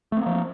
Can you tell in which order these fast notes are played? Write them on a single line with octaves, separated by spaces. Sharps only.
A3 C4 A#3 F3